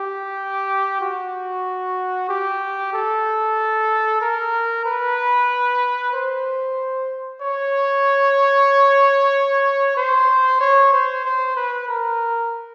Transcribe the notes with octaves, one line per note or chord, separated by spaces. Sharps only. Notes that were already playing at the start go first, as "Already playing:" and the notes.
Already playing: G4
F#4
G4
A4
A#4
B4
C5
C#5
C5
C#5
C5
C5
B4
A#4